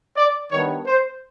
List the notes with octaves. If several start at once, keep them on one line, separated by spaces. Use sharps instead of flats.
D5
D#3 G3 B3 D4 C#5
C5